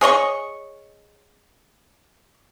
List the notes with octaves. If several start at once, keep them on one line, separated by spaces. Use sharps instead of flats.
G#4 C#5 D#5 C#6